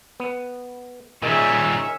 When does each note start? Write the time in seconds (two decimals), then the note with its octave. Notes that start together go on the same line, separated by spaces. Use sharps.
0.20 B3
1.23 A#2 D#3 G3 C#4 D#4 G#4 E5